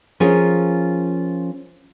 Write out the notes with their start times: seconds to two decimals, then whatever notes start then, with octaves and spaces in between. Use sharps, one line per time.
0.20 F3 C#4 F4 G#4 A#4